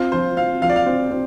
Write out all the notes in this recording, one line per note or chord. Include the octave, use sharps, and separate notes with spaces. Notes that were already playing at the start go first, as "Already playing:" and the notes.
Already playing: C4 F4
F3 C5
C4 F5
F3 F5
D5
F5
C4
C4